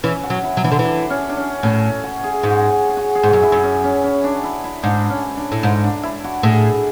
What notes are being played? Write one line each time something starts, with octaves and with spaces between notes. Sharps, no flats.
E3 C#4
F#4
F#3
E4
F#3
E3 D4
D3
E3 D4
C#4
D4
C#4
A2 C#4
F#4
G#4
G#2 F#4
G#4
F#4
G#4
G#2 F#4
F#2
E4
F#2
C#4
C#4
C#4
D4
E4
E4
G#2 D4
C#4
D4
A2
G#2
D4
E4
F#4
A2 G#4